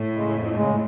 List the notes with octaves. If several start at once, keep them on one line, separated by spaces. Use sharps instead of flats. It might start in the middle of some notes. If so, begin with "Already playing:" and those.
Already playing: A2
C#3 G#3
F2
C#3 G#3